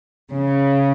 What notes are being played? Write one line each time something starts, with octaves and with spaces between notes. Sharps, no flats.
C#3